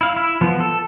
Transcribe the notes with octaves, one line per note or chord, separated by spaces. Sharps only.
E4 F5
E4
F3 B3
A4